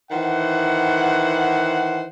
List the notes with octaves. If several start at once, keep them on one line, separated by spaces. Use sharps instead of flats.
D#3 E3 C5 F#5